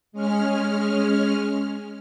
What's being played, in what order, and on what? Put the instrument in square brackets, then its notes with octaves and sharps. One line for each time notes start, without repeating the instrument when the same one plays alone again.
[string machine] G#3 C#4 F6